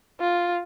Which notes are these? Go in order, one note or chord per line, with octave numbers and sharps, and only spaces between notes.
F4